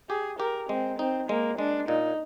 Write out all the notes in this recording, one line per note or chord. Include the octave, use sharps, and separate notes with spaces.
G4 G#4
G4 A#4
G#3 C4
C4 D#4
G#3 A#3
G#3 D4
A#2 D#4